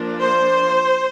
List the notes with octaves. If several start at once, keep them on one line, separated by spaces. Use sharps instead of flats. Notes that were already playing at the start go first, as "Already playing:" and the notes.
Already playing: F3 A#3 D4
C5